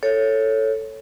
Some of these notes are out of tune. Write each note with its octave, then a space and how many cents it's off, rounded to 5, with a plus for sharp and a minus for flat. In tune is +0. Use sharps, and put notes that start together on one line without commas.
A4 +5 C#5 +0